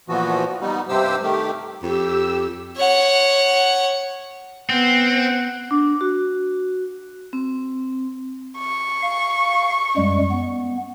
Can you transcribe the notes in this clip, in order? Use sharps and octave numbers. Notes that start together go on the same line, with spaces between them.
A#2 E3 F3 B3 F#4
G3 B3 D#4
G2 C3 G4 C5 E6
D#3 A3 G4
F2 G4 E6
C#5 F#5
B3 C4 F#5
D4
F#4
C4
C#6
F5
F#2 G3 G#3
B3